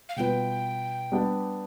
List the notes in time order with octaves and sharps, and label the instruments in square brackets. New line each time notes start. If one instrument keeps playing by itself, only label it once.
[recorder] F5
[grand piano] B2 G3 B3 F4 B4 [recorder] G5
[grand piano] G3 B3 D4 G4 D5